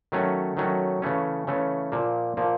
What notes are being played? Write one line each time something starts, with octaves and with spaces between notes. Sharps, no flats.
D#3 F#3 A3 C#4
D#3 F#3 A3 C#4
C#3 E3 A3 C#4
C#3 E3 A3 C#4
A#2 F3 A#3
A#2 F3 A#3